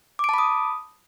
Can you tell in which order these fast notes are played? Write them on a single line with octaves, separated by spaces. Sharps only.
D6 D7 A5 B5 D#6